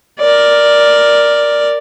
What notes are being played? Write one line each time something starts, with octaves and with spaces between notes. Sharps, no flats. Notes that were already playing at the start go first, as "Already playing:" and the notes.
A#4 D5